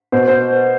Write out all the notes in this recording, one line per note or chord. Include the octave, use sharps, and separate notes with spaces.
B2 C5
C5